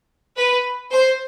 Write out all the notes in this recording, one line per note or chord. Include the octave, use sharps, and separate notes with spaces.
B4
C5